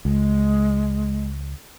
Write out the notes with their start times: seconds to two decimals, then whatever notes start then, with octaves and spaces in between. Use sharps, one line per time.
0.05 C#2 G#3